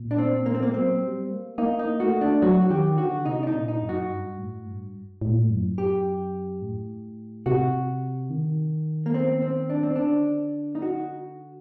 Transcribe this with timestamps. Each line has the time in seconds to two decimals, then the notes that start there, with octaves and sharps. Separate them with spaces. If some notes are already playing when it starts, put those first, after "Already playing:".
Already playing: A#2
0.11 D4
0.18 C4
0.46 A#3
0.55 C4
0.63 A#3
0.74 F#3 C4
1.02 G3
1.30 A#3
1.58 A#3 D#4
1.79 D#4
2.00 A3 F#4
2.21 D4
2.42 F#3 F#4
2.62 F#4
2.70 D#3 G4
2.98 D3 F#4
3.25 C3 D#4
3.43 D4
3.47 D#4
3.54 A#2
3.68 D#4
3.82 F#2
3.89 F#4
4.10 G2
4.38 A2
4.66 G2
5.22 A2
5.29 A#2
5.37 A2
5.50 F#2
5.78 G4
6.62 A2
7.46 C3 F#4
8.30 D#3
9.06 A#3
9.14 C4
9.42 C4
9.70 D4
9.83 C4
9.96 D3 D4
10.75 D#4
10.82 F#4